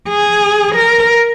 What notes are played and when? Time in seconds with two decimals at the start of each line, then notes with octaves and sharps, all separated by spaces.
0.09 G#4
0.75 A#4